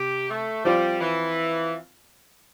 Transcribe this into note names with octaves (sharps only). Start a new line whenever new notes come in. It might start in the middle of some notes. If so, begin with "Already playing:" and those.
Already playing: C3 G4
A3
F3 G3 C4 F4
E3